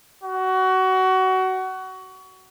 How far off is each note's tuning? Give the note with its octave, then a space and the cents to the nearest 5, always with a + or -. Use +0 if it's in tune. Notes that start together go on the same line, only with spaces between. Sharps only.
F#4 +20